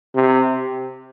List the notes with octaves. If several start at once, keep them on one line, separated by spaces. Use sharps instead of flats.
C3